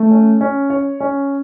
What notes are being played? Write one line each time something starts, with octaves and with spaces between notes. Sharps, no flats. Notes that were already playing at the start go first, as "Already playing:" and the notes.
Already playing: A3
C#4
C#4
C#5
C#4